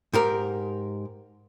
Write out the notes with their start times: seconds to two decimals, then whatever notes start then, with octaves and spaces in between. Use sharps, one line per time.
0.13 G#2 G4 A#4